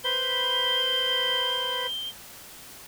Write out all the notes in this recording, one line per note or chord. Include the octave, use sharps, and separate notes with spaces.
B4 C5 B5 G7